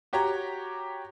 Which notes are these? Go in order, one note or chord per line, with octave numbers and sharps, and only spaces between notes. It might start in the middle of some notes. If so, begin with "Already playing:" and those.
F#4 G4 C#5 A#5